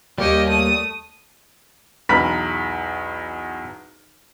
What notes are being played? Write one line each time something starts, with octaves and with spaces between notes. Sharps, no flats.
D#2 G3 A#3 G4 C#5 D#5
A3 D#6
B1 E2 A#5 B5 F6 B6